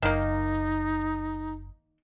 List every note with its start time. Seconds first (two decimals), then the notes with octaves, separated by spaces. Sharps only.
0.02 F#1 D#3 A#3 D#4